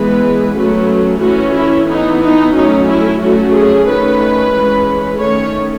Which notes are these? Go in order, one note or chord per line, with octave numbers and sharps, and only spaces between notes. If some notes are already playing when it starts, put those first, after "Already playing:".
Already playing: E3 G#3 B3 B4
F#3 A3 C#4
E3 A3 C#4 F#4
E4
E3 B3 D#4
D#4
F#3 A3 C#4 D#4
E4
F#3 A3 C#4 F#4
G#4
D#3 A3 C#4 B4
E3 G#3 C#4
D#3 A3 C#4 C#5